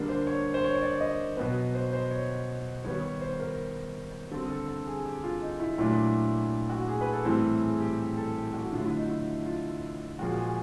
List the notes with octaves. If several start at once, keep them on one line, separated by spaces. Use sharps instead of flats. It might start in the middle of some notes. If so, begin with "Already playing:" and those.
Already playing: D3 G3 A#3 D4
C5
C#5
C5
C#5
C#5
D5
D#5
B2 F#3 B3
C5
C5
C#5
D#3 G3 B3 C#5
C#5
C5
A#4
D3 G3 C4 A4
A4
A4
G#4
G4
F4
D#4
E4
A#2 F#3 A3 D4 E4
F#4
G#4
B4
A4
A2 E3 G3 C4
G#4
G4
G4
A4
G4
F#4
D3 F#3 A3 F4
E4
D#4
E4
F4
A#2 F3 G#3 C#4 F#4
G#4